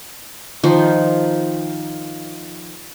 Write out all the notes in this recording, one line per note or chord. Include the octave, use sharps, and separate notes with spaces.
D#3 F3